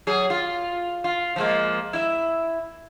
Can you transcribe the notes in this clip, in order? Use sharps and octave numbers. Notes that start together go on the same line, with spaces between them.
F#3 G#4
F4
F4
F3 G#3 A#3
E4 E5